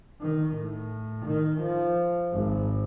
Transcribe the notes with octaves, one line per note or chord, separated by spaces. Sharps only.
D#3
A2
D#3
F3
G#1